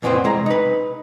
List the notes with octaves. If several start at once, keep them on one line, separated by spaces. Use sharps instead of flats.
F2 A#2 E3 B3 C4 C5
C2 G#3 A#5
D#4 B4